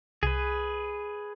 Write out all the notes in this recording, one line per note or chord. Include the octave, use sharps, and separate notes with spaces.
C2 G#4 B4